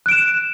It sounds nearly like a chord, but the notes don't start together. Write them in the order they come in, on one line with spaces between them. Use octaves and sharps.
F#6 D7 E7